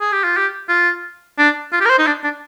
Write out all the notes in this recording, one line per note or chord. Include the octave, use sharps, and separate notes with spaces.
G#4
G4
F4
G4
F4
D4
F4
G4
A#4
C5
D#4
D4
D4